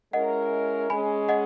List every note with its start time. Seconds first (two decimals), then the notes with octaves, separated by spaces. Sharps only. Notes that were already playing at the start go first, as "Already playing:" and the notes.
0.13 G#3 C#4 E4 A#4 D#5 F#5
0.90 G#3 C#4 G#4 G#5 B5
1.29 D#5 F#5